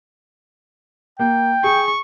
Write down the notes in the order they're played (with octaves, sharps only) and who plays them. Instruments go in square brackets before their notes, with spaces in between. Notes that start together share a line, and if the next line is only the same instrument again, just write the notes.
[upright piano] A#3 [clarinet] G5
[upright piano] G#4 [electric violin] C#6